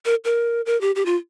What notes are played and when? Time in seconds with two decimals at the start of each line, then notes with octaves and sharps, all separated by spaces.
0.05 A#4
0.25 A#4
0.66 A#4
0.81 G4
0.96 G4
1.06 F4